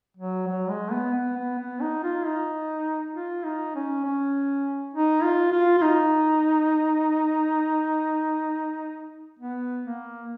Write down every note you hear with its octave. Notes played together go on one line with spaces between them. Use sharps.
F#3
F#3
G#3
B3
B3
B3
B3
D#4
F4
D#4
F4
D#4
C#4
C#4
D#4
F4
F4
F4
D#4
B3
A#3